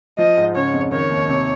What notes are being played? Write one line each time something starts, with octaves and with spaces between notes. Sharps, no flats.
F3 D#5
G#2
C#3 C#5
F2
D#3 C#5
D#2
C3